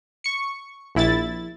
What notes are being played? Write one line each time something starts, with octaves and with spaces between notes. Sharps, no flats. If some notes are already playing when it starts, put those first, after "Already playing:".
C#6 C#7
A#1 E4 A6